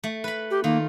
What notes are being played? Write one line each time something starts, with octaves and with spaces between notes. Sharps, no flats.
A3
B4 B5
G4
D#3 A#3 F4